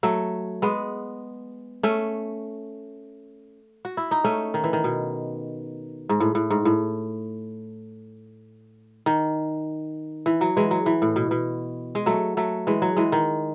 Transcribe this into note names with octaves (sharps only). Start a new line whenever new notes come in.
F#3 A3
G#3 B3
A3 C#4
F#4
E4
D#4
A3 C#4
D#3
E3
D#3
B2
G#2
A2
A2
G#2
A2
D#3
E3
F#3
E3 G#3
F#3
E3
A2
B2
B2
G#3
F#3 A3
F#3 A3
E3 G#3
F#3
E3 G#3
D#3